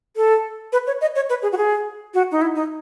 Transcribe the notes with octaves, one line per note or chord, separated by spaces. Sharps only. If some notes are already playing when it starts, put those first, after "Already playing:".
A4
B4
C#5
D#5
C#5
B4
G#4
F#4
G#4
F#4
D#4
E4
D#4